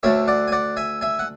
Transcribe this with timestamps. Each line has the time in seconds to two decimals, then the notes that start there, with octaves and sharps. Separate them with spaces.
0.03 D2 D3 A3 C#5 E5
0.28 D5 F#5
0.48 G#5
0.52 D5 F#5
0.77 E5 G#5
1.01 E5 G#5
1.19 F#5